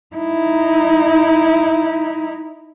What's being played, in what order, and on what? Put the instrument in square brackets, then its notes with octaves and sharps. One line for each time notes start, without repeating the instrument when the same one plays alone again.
[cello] D#4 E4